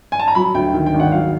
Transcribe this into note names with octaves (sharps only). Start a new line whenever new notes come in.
G#5
A5
A#5
F#3 B5
D2 G5
D#3
G5
G#1
F#5
F#3 F5